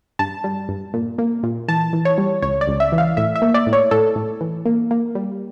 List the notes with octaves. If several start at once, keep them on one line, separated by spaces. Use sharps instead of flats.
G2 A5
G3
G2
A#2
A#3
A#2
E3 A5
E3
C#5
G3
C#2 C#5
D5
C#2
E5
E3
F5
A2 E5
E5
A#3
D5
A2
C#5
A2 A4
A2
E3
A#3
A#3
G3